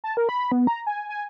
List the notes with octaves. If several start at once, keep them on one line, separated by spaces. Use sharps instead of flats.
A5
A#4
B5
B3
A#5
G#5
G#5